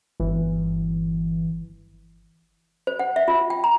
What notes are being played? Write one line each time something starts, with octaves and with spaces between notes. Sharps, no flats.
G1 E3
C5
F#5
E5
F4
G5
A#5